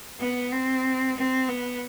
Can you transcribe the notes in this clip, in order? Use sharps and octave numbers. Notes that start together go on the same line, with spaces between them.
B3
C4
C4
B3